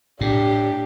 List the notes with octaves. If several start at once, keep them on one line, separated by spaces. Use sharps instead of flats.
A2 D4 G4